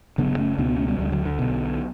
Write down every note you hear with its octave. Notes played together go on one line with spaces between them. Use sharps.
F#1 F#2 C#3 B3 D4
A3 C#4
C#2 B2 B3 D4
B3 D4
A3 C#4
G3 B3
D2 D3 E3 G3
D3 F#3
D3
B1 B2